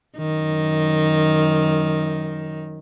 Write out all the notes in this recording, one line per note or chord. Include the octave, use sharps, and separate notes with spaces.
F#2 D#3